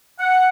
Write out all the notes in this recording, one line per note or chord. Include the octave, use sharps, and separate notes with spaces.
F#5